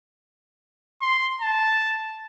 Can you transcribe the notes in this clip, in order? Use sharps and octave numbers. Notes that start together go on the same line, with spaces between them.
C6
A5